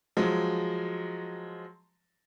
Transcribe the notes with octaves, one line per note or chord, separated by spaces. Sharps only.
F3 F#3 G#3